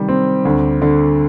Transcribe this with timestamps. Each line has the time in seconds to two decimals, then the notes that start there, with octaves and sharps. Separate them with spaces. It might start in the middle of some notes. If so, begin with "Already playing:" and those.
Already playing: C3 D#3 G3
0.09 C4
0.45 D2
0.82 D3